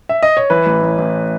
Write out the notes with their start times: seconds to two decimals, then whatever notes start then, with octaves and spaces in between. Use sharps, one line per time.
0.09 E5
0.23 D#5
0.37 C#5
0.50 E3 B4
0.66 A1
0.82 A1
0.98 A1